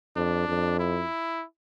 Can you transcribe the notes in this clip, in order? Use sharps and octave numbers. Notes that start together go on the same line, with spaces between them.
F2 D4
F2
E4